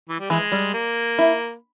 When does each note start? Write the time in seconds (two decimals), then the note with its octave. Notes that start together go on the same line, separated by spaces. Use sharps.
0.09 E3
0.20 G3
0.30 E3 G#3
0.52 G3
0.74 A#3
1.18 E4